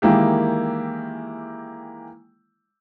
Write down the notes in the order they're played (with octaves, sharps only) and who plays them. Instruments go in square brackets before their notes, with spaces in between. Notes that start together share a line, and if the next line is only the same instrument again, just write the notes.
[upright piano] D#3 E3 G#3 A#3 E4 G4